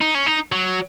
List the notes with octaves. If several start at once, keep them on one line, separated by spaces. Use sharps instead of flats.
D#4
C#4
D#4
F#3